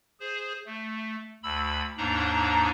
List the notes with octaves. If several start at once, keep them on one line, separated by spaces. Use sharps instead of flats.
G#4 C5
A3
D2 B5 E6
D#2 G#2 D4 D#4 A#5